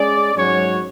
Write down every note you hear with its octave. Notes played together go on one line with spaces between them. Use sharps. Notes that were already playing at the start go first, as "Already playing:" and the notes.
Already playing: G#3 C#4 G#4 D5
G#2 F#3 C#4 F#4 C#5